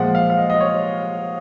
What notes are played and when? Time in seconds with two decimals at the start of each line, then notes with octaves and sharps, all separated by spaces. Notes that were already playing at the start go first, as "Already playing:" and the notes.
Already playing: A#2 F3 G#3 F#5
0.15 F5
0.30 F5
0.37 D#5
0.50 D#5
0.60 C#5